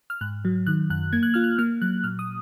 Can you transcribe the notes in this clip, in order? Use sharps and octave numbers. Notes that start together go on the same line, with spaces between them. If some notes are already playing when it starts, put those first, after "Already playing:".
F6
G#2 F#6
F#3
D#3 F#6
F#2 F#6
A#3 G#6
F#6
F4 F6
F#6
A#3 F6
F#3 F#6
A#2 F6
D#6